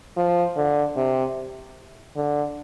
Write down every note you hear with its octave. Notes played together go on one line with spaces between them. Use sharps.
F3
D3
C3
D3